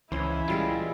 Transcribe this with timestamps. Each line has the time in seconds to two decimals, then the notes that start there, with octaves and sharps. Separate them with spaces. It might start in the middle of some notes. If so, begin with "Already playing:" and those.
0.12 C#2 E3 C#4 E4 C5
0.48 A#2 G3 G#3 F4